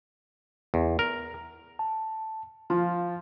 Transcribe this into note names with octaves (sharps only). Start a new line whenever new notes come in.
E2
A#4
A5
F3 F4 F5